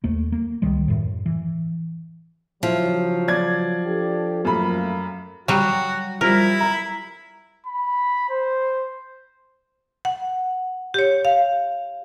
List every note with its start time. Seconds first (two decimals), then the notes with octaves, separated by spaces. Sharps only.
0.04 D#2 A3 A#3
0.32 A#3
0.62 C#2 D#3 G3 G#3
0.88 F#2 A2
1.26 E3
2.63 C#3 F3 F#3 E4
3.28 D5 G#6
3.85 D4 G4 A4
4.45 F#2 A3 A#3 B5
5.48 F#3 G3 F#4 F#5
6.21 F3 G3 E4 A#4
6.60 A#5
7.66 B5
8.30 C5
10.05 F#5
10.94 G4 C#5
11.25 F5